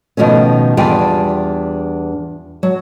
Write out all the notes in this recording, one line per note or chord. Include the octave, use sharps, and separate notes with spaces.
B2 D#3 F3 A3 C#4
E2 G3 D4 F4 G5 G#5
F#3